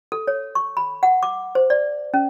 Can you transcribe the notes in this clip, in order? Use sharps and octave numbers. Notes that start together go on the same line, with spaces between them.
A4
C#5
C#6
B5
F#5
D6
C5
D5
C#4